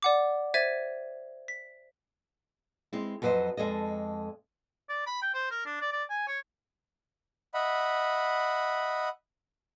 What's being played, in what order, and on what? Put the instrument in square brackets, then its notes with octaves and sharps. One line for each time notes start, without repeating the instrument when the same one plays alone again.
[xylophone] D5 F#5 D6
C5 E5 G#6 A6 D#7
B6
[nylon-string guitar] G#3 C4 E4
F2 F#3 B4 C5 D#5
F2 G#3 A4 D#5
[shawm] D5
B5
G5
C5
A#4
D4
D5
D5
G#5
C#5
[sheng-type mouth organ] D#5 E5 F#5 B5